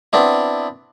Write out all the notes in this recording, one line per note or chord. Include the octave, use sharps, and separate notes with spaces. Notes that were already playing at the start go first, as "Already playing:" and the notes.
B3 C4 D4 E4